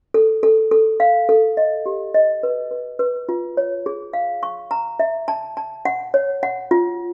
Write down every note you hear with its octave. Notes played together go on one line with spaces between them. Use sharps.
A4
A4
A4
F5
A4
D#5
G4
D#5
B4
B4
B4
F4
C#5
G#4
F5
C#6
A#5
E5
A5
A5
F#5
C#5
F#5
F4